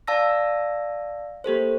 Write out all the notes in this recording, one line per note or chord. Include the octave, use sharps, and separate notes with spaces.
D5 F5 A5 E6 A#6
A#3 G4 A4 C5